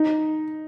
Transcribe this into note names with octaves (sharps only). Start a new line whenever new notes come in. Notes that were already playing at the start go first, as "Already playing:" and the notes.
Already playing: D#4